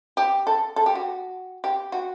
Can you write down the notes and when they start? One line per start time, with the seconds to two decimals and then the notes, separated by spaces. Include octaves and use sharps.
0.17 G4
0.47 A4
0.76 A4
0.86 G4
0.95 F#4
1.64 G4
1.92 F#4